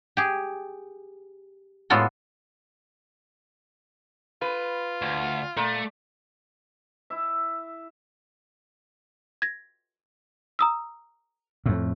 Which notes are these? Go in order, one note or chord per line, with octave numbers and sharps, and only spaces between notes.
G4 G#4
A2 G#3 B3 F4 F#4 A4
F4 B4
D2
A#2 A3
E4 E5
G#6 A#6
A#5 D#6 E6
F2 A2